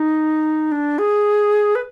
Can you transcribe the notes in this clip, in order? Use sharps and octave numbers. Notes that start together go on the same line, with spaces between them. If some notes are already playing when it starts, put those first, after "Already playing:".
Already playing: D#4
D4
G#4
B4